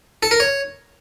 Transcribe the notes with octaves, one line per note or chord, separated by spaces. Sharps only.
A4
A#4
C#5